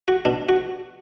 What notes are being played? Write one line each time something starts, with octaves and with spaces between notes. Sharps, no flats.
F#4
B2 D4
F#4